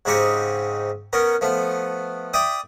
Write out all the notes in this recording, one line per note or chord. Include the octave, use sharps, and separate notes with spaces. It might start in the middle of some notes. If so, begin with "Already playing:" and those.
G#2 C#3 C4 D#4 G4 C#6
B3 C#4 A#4
F3 A3 B3
D5 E5 G5 D#6